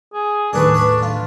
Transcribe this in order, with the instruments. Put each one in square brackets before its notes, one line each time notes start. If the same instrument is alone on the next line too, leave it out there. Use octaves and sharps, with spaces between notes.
[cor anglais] G#4
[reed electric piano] D#2 A2 D#3 [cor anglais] D4 [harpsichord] A4 B4 C#5
[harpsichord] C#5 A5 B5
F4